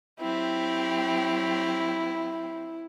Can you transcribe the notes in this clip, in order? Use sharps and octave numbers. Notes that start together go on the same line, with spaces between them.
F#3 C4 E4 G4